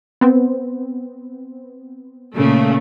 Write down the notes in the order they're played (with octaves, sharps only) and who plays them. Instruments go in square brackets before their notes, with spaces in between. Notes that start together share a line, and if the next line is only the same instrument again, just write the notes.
[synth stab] B3 C4
[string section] A#2 C#3 A3